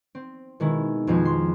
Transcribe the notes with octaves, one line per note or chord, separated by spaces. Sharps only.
C4
B2 D#3 G#3 E4
F2 B2 F3 G#3
C6